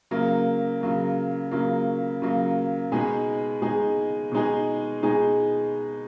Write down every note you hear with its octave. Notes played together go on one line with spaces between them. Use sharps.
C#3 F#3 A#3
C#3 F#3 A#3
C#3 F#3 A#3
C#3 F#3 A#3
B2 G#3 D#4 G#4
B2 G#3 D#4 G#4
B2 G#3 D#4 G#4
B2 G#3 D#4 G#4